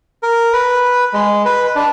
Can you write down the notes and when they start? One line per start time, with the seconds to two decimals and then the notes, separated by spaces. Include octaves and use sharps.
0.23 A#4
0.53 B4
1.14 G#3
1.45 B4
1.76 D4